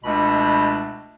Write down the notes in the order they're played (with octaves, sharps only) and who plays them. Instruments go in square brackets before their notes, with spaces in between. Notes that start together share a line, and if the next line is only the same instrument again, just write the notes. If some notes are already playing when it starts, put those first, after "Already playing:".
[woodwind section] C#2 B2 A3 D4 B5